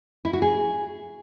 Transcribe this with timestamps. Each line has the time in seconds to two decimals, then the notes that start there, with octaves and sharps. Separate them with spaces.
0.25 E4
0.33 F#4
0.42 G#4